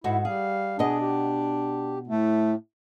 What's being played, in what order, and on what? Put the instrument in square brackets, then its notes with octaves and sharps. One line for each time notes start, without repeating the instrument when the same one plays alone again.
[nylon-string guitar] G#2 F#4 A4 [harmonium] E4
[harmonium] G3 F5 [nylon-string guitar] G#4
[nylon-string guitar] B2 B3 D#5 [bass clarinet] D4 [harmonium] G#4
[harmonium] G4
[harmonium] A2 [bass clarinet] A3